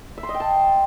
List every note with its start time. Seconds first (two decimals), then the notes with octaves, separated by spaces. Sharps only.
0.18 E5
0.23 C6
0.29 D#5
0.34 G5
0.40 A5